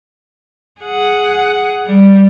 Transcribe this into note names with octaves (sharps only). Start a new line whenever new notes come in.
G#4 F#5
G3